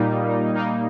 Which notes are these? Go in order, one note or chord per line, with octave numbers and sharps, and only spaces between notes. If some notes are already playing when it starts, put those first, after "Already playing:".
Already playing: A#2 G3 A#3 D#4
A#2 G3 A#3 D#4